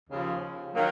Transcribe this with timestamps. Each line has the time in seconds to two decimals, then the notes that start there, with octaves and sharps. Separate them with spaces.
0.09 D#2 C#3 F3
0.75 D#3 F#3 A#3